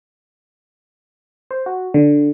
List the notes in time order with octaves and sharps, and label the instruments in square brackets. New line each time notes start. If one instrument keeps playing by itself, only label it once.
[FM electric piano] C5
F#4
D3